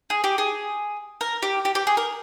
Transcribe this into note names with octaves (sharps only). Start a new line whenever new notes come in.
G#4
G4
G#4
A#4
G4
G4
G4
G#4
A#4